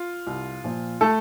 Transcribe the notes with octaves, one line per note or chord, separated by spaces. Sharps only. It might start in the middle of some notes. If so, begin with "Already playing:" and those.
Already playing: F4
C2
A#2 F3
A3 A4